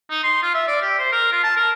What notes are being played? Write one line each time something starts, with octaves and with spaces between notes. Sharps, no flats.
D#4
C6
F4
E5
D5
G4
C5
A#4
F4
A5
A#4